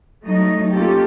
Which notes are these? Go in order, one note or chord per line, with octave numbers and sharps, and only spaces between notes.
F#3 G3 A3 D#4 D#5
A#3 C#4 D#4 F4 G4 A4